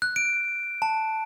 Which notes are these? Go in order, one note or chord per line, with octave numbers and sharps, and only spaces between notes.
F#6
D7
A5